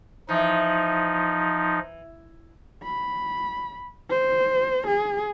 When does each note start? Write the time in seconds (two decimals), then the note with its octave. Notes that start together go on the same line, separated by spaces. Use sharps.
0.29 E3 F3 D#4
2.83 B5
4.10 C5
4.87 G#4